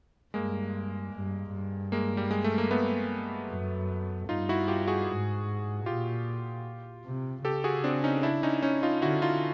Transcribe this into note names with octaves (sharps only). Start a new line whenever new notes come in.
G2 G#3 A#3
G2
G2
G#3 A#3
G3
G#3
A3
A#3
A3 B3
F#2
G2 D#4 F4
E4 F#4
F4 G4
F#4 G#4
G#2
A#2 F4 G4
C3
C#3 G4 A4
F#4 G#4
C4 D4
C#4 D#4
D4 E4
C#4 D#4
C#4 D#4
D#4 F4
D3 E4 F#4
D#4 F4